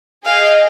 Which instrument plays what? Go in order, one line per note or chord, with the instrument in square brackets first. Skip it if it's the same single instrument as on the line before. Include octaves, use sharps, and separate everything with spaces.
[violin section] G#4 D#5 G5 [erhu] F5